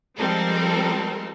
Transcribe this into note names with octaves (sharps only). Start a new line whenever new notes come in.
F3 G3 G#3 C4 A4 A#4